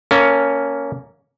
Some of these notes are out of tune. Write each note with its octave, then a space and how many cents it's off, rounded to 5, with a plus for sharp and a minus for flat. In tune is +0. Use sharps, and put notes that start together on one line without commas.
A#3 +0 C#4 +10 A4 +25